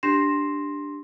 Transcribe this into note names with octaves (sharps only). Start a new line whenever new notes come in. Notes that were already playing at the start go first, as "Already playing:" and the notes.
D4 G4 C6 A#6 C7 E7